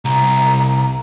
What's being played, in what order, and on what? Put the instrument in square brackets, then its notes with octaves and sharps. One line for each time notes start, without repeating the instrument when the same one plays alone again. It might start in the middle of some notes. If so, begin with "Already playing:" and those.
[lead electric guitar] C2 [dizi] A#5